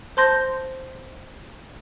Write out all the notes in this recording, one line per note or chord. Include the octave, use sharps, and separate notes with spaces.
C5 A5 C6 G6 A#6